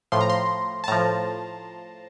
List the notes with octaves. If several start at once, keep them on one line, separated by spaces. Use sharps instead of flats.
A2 F3 C6
A#5
C6
A5
A2 F3 A#5